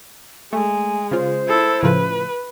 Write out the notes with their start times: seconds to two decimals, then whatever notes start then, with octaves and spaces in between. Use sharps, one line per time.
0.53 G#3 A3 G#5
1.11 C#3 F4 C5
1.48 E4 A4
1.83 A2 C#3 F3 B4